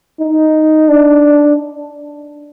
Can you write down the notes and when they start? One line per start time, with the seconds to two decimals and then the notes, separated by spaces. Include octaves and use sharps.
0.20 D#4
0.89 D4